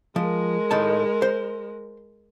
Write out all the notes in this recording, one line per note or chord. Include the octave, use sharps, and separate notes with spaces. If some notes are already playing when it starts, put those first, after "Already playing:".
F3 G#3 A#4
A2 D#3 A5
C5